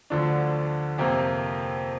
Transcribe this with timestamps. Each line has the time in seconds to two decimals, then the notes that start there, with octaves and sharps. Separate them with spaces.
0.10 D2 D3 F3 D4
0.98 F2 C3 A#3